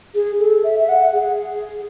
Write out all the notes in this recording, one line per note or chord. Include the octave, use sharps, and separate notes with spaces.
G#4
A4
E5
E5
F#5
G#4